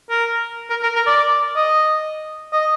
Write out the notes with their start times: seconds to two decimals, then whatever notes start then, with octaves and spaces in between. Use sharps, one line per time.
0.10 A#4
0.70 A#4
0.83 A#4
0.95 A#4
1.07 D5
1.56 D#5
2.53 D#5